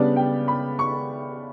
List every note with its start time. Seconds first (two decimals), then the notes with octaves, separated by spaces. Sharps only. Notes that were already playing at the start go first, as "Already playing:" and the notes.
Already playing: C#3 G3 B3 D4 D5
0.16 G5
0.48 B5
0.79 C#6